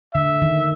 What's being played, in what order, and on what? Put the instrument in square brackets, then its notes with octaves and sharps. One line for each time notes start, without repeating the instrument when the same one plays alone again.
[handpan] D3 [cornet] E5
[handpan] D#3